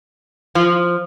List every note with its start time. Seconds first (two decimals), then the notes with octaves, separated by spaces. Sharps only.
0.55 F3